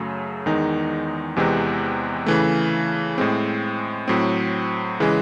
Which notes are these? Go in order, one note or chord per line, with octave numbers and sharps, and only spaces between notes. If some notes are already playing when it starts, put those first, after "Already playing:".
Already playing: F#2 C#3 F#3 A3
E2 D#3 G#3 D#4
E2 C3 E3 G#3 C4
C#3 E3 A3
A2 G#3 C4
A2 F#3 C4
C#3 E3 G#3